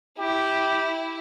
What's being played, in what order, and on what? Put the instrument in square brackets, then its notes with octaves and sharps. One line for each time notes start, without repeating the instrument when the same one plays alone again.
[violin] E4 [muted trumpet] G4